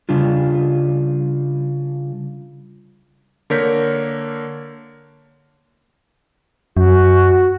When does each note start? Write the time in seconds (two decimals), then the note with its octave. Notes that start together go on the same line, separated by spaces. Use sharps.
0.09 C#3 G3 D4 F4
3.50 D3 A#3 A#4 C#5 G6 B6
6.77 F#2 F#4